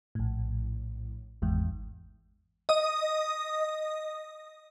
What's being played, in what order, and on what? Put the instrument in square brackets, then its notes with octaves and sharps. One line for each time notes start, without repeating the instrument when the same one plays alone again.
[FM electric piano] A#1 A2
G#1 E2 G#2
[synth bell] D#5 D#6